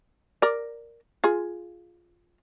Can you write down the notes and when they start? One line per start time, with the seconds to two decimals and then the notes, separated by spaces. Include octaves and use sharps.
0.42 A#4 D5
1.24 F4 G#4